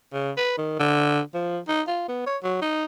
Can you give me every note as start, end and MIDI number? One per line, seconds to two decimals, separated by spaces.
0.13 0.31 49
0.37 0.54 71
0.58 0.78 51
0.79 1.20 50
1.34 1.58 53
1.68 1.82 63
1.87 2.03 65
2.08 2.25 59
2.26 2.37 73
2.43 2.59 54
2.62 2.85 63